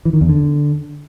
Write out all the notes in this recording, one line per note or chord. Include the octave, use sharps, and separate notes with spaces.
E3
D#3
E2
D3